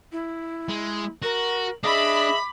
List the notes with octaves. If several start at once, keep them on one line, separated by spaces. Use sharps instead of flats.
E4
G#3
F#4 A#4
D4 G#4 D#5 E5 B5 D6